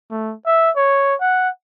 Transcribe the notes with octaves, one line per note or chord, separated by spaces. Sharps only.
A3
E5
C#5
F#5